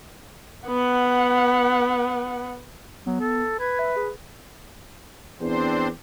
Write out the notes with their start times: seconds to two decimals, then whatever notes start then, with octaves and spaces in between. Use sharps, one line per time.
0.67 B3 F#5
3.06 F#3 B3
3.20 A4
3.59 B4 G#6
3.79 E5
3.96 G#4
5.41 E2 C4 D4 C5